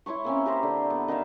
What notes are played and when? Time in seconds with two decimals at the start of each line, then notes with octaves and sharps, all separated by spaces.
0.06 E4 C#5 C6 C#6
0.25 A#3 C4 C#4
0.46 G4 A#4 C5 E5
0.63 D3
0.90 B3
1.08 D#3 D#4 E5 F5